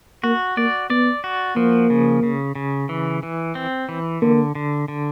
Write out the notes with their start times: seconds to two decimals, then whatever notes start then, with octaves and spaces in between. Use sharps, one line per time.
0.24 A#3 F#4
0.57 A#3 D5
0.90 B3 D5
1.24 F#4
1.56 F3 A#3
1.90 C#3
2.23 C#3
2.55 C#3
2.89 E3
3.23 E3
3.55 C4
3.89 E3
4.22 D3 A#3
4.55 D3
4.88 D3